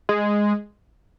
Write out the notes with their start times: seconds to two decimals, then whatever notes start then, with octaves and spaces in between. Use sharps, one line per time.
0.09 G#3